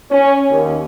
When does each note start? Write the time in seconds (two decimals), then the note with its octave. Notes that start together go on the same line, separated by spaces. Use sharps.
0.11 C#4
0.51 D#2